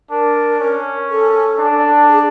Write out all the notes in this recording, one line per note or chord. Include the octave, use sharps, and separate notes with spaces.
D4 A#4
C#4
A4
D4
G#4